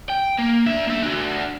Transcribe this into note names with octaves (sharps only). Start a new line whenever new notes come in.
G5
A#3
D4 E5
A#3 E5
D4 F#4